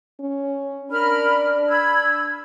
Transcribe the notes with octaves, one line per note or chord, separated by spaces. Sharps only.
C#4
D4 A#4 B5 F6
B5 E6 G#6